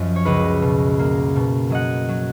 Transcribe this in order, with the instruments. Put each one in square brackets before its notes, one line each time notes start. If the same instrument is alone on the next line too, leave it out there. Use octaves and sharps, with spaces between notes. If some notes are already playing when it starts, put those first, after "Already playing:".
Already playing: [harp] F#2 F3 D#5
C#5
C#2 B4 D#5
B2
A#3
B2
F#3 D#5 F#5
F#3